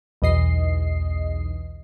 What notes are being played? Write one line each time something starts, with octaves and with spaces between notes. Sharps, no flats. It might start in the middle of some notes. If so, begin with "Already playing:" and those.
B1 E2 D#5 C7